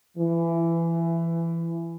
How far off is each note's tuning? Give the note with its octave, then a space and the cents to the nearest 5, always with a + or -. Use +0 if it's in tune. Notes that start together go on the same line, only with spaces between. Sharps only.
E3 +20